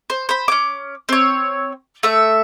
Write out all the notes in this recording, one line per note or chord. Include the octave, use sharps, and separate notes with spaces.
C5
C5 B5
C#4 D6
C4 C#5
A3 E5